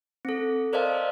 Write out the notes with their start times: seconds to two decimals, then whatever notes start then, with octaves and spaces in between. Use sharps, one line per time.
0.25 C4 A4
0.73 A#4 C5 D5 D#5 F5 A5